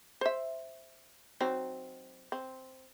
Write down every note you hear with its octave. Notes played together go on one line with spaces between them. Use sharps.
C5 E5
F#3 C4 D#4
C4